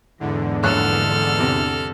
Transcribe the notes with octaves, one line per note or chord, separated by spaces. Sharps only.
E2 G#2 D3
A#1 A4 C#5 F6 F#6
C3